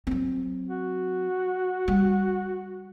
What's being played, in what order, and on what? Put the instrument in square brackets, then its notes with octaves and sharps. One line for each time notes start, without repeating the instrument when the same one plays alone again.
[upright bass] F#3 C4
[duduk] F#4
[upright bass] G3